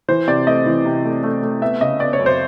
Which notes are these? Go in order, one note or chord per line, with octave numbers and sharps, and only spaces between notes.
E3 C5
C3 D5
A3 D#5
E3
C3
A3
A3
A3
B3 E5
C#3 D#5
B3 D5
C#5
F#2
C5